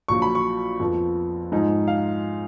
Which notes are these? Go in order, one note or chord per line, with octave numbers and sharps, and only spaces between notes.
A#1 A#2 F#3 C#6
B5
C#6
F2 F3 B3
G#2 F3 G#3 D#4
F5